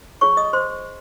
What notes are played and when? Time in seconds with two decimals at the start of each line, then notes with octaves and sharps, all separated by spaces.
0.21 F4 G#4 C#5 C#6
0.37 D#5 D#6
0.53 C5 C6